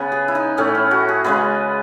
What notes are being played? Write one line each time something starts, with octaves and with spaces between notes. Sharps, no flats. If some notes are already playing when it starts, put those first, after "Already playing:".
Already playing: C#3 B3 B4 C#5
G#4
E4
D#4
A2 E3 A3 C#4
E4
F#4
G#4
C#3 G#3 B3 B4